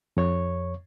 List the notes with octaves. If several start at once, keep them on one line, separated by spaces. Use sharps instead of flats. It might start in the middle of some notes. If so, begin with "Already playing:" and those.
F2 C#5 C#6